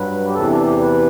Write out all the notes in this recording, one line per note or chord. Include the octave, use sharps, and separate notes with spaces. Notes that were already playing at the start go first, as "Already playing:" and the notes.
Already playing: G2 F#3 B4
G4
E2 C3 E3 A4
D4
G4
B4